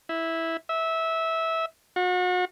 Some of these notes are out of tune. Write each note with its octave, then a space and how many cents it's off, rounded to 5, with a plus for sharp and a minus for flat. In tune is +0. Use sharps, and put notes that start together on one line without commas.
E4 -5
E5 -15
F#4 -35